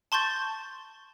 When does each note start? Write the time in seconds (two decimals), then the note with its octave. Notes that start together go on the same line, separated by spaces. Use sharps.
0.12 A5 C6 C#6 G6 A6